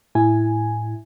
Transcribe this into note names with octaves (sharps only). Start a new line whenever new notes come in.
A2 E4 G#5